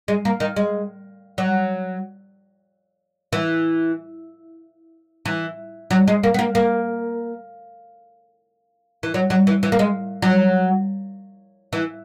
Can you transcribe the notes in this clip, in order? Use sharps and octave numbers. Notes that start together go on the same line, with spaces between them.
G#3
A#3
D#3
G#3
F#3
E3
E3
F#3
G#3
A#3
B3
A#3
A#3
E3
F#3
F#3
E3
E3
A#3
G#3
F#3
E3